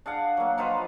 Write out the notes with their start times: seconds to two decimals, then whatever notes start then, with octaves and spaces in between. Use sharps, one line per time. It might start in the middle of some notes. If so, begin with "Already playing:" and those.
0.06 D4 G#4 F5 F#5
0.37 F#3 A#3
0.58 F3 D#4 F4 B4